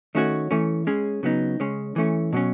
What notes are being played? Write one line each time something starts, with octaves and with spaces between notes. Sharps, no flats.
D#3 A3 C#4 F#4 C#5
E3 A3 C#4
G#3 C#4 G#4 C#5
C#3 F#3 B3 D#4
C#3 G#3 C#4
E3 A3 C#4
B2 F#3 C#4